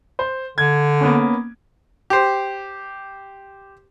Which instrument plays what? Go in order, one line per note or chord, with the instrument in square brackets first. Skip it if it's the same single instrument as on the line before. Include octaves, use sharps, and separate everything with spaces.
[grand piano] C5
[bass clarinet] D3 [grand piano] G#6
[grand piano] A#3 B3 C#4
[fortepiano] G4 C5